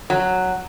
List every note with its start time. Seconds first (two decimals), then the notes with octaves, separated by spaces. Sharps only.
0.10 F#3